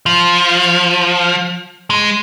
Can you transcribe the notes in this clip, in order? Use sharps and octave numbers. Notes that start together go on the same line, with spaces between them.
F3
G#3